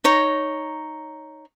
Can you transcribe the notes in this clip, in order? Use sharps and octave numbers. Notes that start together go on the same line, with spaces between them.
D#4 C#5 A#5